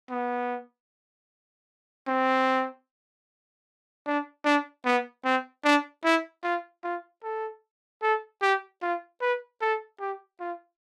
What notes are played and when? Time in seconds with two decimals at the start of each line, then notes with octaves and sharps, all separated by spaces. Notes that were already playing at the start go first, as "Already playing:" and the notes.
0.10 B3
2.08 C4
4.06 D4
4.45 D4
4.85 B3
5.25 C4
5.64 D4
6.04 E4
6.44 F4
6.84 F4
7.23 A4
8.02 A4
8.42 G4
8.82 F4
9.21 B4
9.61 A4
10.00 G4
10.40 F4